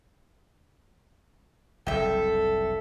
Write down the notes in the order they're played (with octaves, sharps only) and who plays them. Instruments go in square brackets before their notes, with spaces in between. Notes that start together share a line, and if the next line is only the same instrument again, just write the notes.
[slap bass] F#1 C2 [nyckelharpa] A4 [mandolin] E5 G5